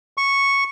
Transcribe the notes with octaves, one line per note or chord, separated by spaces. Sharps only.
C#6